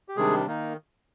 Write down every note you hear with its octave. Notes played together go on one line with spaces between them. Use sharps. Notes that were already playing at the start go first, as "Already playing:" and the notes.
G4
C3 D#3 G3 G#3 D4 G#4
D#3 A#3 D#4